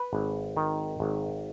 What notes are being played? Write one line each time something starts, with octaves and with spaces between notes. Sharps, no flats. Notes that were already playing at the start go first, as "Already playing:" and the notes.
Already playing: B4
G#1
D#3
G#1